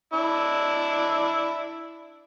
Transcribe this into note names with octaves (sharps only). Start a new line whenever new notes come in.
D4 E4